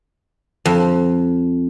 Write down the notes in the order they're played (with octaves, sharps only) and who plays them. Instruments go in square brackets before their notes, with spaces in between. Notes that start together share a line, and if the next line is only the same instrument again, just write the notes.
[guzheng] F2